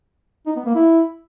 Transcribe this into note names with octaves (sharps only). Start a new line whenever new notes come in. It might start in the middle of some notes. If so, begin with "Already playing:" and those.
D#4
B3
A#3
E4